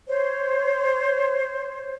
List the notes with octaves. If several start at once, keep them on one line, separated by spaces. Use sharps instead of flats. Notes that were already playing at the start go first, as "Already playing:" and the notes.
C5 C#5